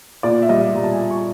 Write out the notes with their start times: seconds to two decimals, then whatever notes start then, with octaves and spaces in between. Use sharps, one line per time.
0.23 A#2 D5
0.42 E5
0.49 G3 D#5
0.75 G3 A#5
0.84 A5
0.92 G#5
1.00 A#2 A5
1.11 C#6